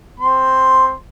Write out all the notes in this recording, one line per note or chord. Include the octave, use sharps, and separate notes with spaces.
C4 C6